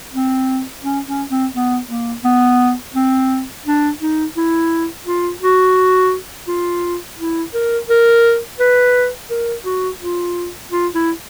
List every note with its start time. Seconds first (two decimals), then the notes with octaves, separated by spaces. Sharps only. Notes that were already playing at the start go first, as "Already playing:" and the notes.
0.13 C4
0.84 C#4
1.07 C#4
1.31 C4
1.54 B3
1.89 A#3
2.24 B3
2.95 C4
3.66 D4
4.01 D#4
4.37 E4
5.07 F4
5.42 F#4
6.48 F4
7.18 E4
7.54 A#4
7.89 A#4
8.60 B4
9.30 A#4
9.65 F#4
10.00 F4
10.71 F4
10.95 E4